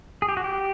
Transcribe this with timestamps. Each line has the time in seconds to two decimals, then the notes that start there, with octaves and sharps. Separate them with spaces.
0.22 G#4
0.29 G4
0.37 F#4
0.44 G4